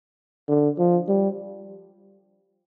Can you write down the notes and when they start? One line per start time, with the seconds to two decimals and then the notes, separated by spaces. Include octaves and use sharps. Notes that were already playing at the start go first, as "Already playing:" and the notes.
0.49 D3
0.78 F3
1.08 G3